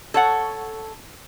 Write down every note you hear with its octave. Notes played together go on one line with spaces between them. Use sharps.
A4 C#5 F#5